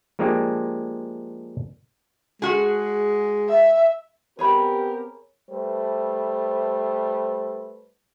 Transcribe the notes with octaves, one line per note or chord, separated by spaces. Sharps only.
F3 G#3 A#3 D4 G4
G#3 F#4 G#4
E5
B3 C4 G4 G#4 A#4 C#5 B5
G3 A3 B4 C5